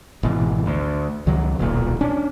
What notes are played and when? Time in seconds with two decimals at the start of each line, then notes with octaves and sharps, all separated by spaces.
0.23 G#1 B2 E3
0.66 D2
1.27 C#2 D#3 F#3
1.59 D#1 B1 A#2
2.01 C#4 D4